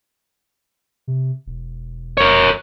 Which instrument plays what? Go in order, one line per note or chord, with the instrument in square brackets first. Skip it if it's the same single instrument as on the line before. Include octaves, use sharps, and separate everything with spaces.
[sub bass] C3
E1
[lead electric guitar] A#4 C#5